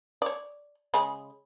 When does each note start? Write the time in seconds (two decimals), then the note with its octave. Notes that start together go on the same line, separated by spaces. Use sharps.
0.22 C#5 D5
0.94 C#3 G#3 B5